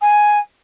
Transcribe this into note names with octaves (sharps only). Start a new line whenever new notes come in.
G#5